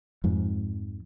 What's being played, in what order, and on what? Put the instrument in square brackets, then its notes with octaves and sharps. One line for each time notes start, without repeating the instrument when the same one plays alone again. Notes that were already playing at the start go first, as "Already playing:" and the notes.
[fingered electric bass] F2 G#2